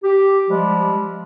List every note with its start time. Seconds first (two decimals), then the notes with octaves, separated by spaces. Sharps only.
0.04 G4
0.49 F3 G3 G#3